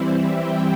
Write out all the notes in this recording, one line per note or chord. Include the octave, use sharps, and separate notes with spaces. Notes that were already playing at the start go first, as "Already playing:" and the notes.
Already playing: E3 G3 C4 E4
G5